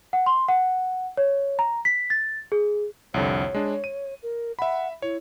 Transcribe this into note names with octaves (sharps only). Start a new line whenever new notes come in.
F#5
C6
F#5
C#5
A#5
B6
A6
G#4
C2 F2 D3 C#5
G#3 D4
D#7
A#4
E5 F#5 B5
E4 C#5